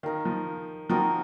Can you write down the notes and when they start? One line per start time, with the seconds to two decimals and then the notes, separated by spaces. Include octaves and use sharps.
0.03 D#3 D#4 A#4 F5
0.25 F3
0.90 F3 C4 D#4 F#4 A#4